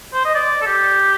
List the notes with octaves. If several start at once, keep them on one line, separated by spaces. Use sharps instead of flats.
C5
D#5
D5
A4
G4